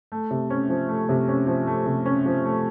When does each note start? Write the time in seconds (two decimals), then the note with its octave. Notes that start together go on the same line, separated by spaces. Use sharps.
0.12 A3
0.31 C3
0.50 C#4
0.69 F3
0.89 A3
1.09 C3
1.28 C#4
1.47 F3
1.67 A3
1.86 C3
2.06 C#4
2.26 F3
2.45 A3